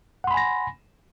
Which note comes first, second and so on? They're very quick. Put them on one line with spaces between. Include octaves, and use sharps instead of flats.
F#5 C6 B5 G#5 A#6